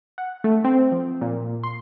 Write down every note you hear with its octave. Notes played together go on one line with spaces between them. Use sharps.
F#5
A3
C4
F3
A#2
C6